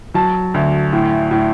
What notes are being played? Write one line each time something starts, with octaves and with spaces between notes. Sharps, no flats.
F#3 A5
D2
A2
A2